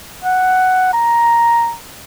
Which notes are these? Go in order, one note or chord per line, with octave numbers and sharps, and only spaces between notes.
F#5
A#5